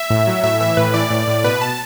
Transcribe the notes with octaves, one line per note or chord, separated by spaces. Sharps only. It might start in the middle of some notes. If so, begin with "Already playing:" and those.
Already playing: E5
A2
F#3
A2 E5
E3 E5
A2 B4
E3 D5
A2
A2
B2 B4
A5